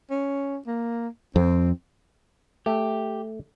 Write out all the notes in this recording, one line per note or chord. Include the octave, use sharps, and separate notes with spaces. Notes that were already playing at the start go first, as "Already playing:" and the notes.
C#4
A#3
F2 C4
A3 G4